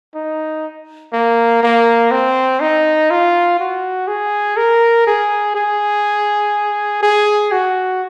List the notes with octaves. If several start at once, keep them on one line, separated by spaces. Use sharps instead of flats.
D#4
A#3
A#3
C4
D#4
F4
F#4
G#4
A#4
G#4
G#4
G#4
F#4